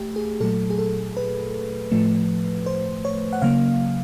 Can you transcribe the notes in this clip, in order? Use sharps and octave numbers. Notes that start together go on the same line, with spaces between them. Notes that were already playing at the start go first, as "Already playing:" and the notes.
Already playing: A3 G4
G#4
A#2 F#3 A3 A4
G#4
A4
B4
A2 F3 A3
C5
C#5
F#5
C#3 F#3 A#3 F5